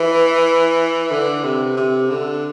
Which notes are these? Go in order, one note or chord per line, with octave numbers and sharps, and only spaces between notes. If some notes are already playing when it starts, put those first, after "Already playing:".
Already playing: E3
D3
C3
C3
D3